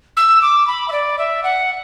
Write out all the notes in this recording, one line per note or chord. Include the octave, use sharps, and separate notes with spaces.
E6
D6
B5
E5
D5
E5
F#5